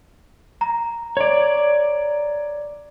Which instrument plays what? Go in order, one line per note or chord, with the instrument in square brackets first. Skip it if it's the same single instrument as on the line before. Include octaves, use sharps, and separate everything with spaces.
[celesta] A#5
[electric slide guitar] C#5 D5